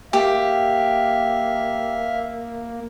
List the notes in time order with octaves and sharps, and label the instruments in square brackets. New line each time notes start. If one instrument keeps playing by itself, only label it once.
[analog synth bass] A#3 [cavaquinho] G4 [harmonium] E5 F5